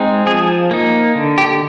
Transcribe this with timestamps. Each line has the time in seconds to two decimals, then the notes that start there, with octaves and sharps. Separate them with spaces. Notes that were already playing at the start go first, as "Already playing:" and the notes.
Already playing: G#3 C4 D#4
0.26 F3 G#4
0.71 A#3 D#4
1.15 D3
1.38 G4